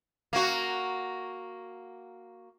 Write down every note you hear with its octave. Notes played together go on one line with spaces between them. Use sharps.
A#3 F#4